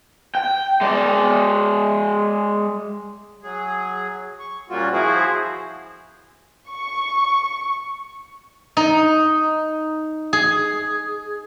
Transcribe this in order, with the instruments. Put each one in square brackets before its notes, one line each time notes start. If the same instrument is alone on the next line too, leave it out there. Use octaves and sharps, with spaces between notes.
[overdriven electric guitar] G5
G#3 D5
[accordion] F#3 G#4
C#6
A#2 C#3 G3 A#3 F4 F#4
F3 E4 F#4 G#4 C5
[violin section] C#6
[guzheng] D#4
G#4